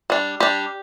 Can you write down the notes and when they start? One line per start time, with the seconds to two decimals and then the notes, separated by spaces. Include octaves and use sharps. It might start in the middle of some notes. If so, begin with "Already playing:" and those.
0.10 G3 D4
0.40 G3 D4 G4